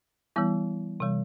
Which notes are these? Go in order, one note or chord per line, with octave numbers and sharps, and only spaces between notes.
E3 G3 B3 E4
C3 E3 G3